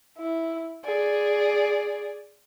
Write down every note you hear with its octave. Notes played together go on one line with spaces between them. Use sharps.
E4
G#4 D5